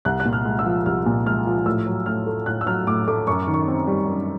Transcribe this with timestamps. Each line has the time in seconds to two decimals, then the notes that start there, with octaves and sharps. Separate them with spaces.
0.05 C2 F#6
0.20 F#6
0.25 A#2
0.33 F6
0.45 G#3
0.59 E6
0.65 F3
0.86 C2 F6
1.06 A#2
1.26 G#3 F6
1.46 F3
1.66 A2 E6
1.86 F#3
2.06 A2 F6
2.26 A3
2.46 A2 F#6
2.61 E6
2.66 F#3 F6
2.87 A2 D6
3.08 A3 D6
3.27 F#2 C#6
3.48 D#3
3.54 C#6
3.68 C4
3.87 G3
4.07 F#2